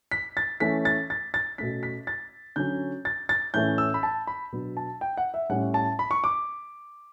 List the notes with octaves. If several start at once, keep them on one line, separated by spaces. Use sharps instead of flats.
B6
A6
E3 A3 C#4 B6
A6
A6
A6
B2 A3 C#4 B6
B6
A6
D3 F#3 C#4 G6
A6
A6
A2 E3 A3 C#4 G6
E6
B5
A5
B5
B2 F#3 B3 D4
A5
G5
F#5
E5
A2 G3 C#4 F#5
A5
B5
C#6
D6